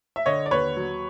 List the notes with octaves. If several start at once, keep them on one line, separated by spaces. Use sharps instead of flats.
E5
D3 C#5 D#5
D5
D#2 B4 C#5
F#3